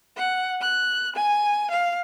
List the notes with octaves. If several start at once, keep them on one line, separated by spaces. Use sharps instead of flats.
F#5
F#6
G#5
F5